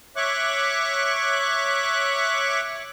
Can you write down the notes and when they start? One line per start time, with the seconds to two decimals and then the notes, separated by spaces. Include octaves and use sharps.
0.16 C#5 E5 C#6 D6 F#6